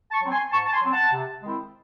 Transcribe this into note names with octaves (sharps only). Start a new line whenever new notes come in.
A5 C#6
F#3 C4
G#5 C6
G#2 A5 C#6
A5
G#5 C6
F#3 C4
F#5 A5
C3
D#3 G#3 C4 E4